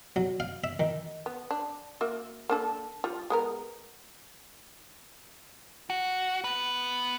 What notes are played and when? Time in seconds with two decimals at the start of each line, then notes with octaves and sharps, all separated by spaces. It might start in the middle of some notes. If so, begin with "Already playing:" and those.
0.16 F#3
0.40 F5
0.64 E5
0.80 D#3
1.26 B3
1.51 D4
2.01 A#3 F#4 E5
2.49 A#3 D4 A4
3.04 G3 F4
3.30 G#3 B3 A#4
5.90 F#4
6.44 B3 B4